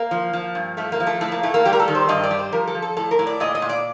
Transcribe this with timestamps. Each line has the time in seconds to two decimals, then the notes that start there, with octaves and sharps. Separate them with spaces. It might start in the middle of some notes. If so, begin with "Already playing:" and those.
Already playing: A#3
0.11 F3
0.33 F3
0.55 G2
0.77 F3 A3
0.92 A#3
1.00 F3
1.07 A3
1.21 A2 A3
1.32 A#3
1.43 A2 A3
1.54 A#3
1.65 G3 G4
1.73 A#4
1.79 A4
1.88 D#3
1.95 C5
2.09 G2 D#5
2.23 D5
2.31 G3
2.39 C5
2.52 F3 A#4
2.67 A4
2.75 F3
2.82 A4
2.97 A2 A4
3.11 A#4
3.19 A2
3.27 D5
3.40 A#2 D#5
3.55 D#5
3.62 A#2
3.69 D5